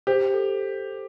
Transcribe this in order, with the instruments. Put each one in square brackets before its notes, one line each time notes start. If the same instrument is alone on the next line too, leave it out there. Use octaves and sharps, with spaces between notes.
[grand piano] G4 [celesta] C5
[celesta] A4